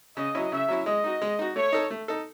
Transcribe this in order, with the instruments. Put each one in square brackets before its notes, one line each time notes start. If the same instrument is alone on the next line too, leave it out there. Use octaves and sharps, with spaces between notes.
[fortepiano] C#3 [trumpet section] D#5
[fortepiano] F#3 C#4 E4
[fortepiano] C#3 [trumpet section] E5
[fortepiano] F#3 C#4 E4
[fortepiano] G#3 [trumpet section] D#5
[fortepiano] D#4 F#4
G#3
D#4 F#4
[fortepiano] A3 [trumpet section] C#5
[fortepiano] D#4 A4
A3
D#4 A4